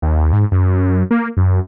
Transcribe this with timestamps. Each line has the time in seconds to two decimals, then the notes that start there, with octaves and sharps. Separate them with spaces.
0.02 D#2
0.32 G#2
0.51 F#2
1.11 A#3
1.37 F#2